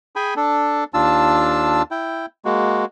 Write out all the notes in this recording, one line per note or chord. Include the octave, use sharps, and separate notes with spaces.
G#4 G5 G#5 B5
D4 A4
D#2 D4 F4 A5 E6
E4 G5
G#3 A#3 F#4